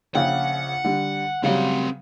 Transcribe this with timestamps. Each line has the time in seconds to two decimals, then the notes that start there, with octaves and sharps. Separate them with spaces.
0.15 A#1 C#3 F#5 G5
0.84 D3 G3
1.44 C#3 F#3 G3 C4 F#5